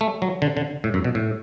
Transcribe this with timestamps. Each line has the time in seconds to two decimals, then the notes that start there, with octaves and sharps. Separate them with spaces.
0.01 A3
0.22 F#3
0.42 D3
0.57 D3
0.84 A2
0.94 F#2
1.04 B2
1.15 A2